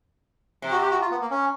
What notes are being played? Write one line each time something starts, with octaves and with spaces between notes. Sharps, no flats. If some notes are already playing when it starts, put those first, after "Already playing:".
C3
F#4
G4
F#4
F4
B3
A#3
C#4